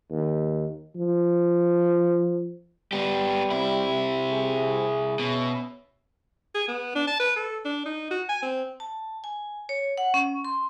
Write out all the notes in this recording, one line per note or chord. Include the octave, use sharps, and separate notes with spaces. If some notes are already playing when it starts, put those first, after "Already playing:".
D#2
F3
G3 B3 G4
C2 C3 C4 E4
G#4
B2 C#4 E5
G#4
B3
D4
A5
B4
A4
D4
D#4
F#4
G#5
C4
A5
G#5
C#5
F#5
C#4
C6